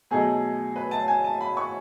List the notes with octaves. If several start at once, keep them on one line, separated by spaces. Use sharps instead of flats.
B2 F#3 A3 D#4 G#4
B4
A5
G#5
A5
B5
C#6